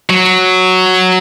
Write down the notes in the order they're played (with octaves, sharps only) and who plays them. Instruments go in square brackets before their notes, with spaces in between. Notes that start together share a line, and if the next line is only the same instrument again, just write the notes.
[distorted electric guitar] F#3